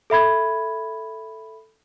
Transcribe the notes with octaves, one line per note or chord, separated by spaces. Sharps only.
A4 E5 B5 G#6